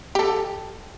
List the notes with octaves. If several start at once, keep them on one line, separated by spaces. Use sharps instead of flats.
G4 A4